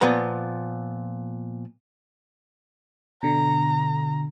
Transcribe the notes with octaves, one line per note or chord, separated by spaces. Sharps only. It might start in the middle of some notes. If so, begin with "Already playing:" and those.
A#2 F3 B3 A#5
B2 D3 A#5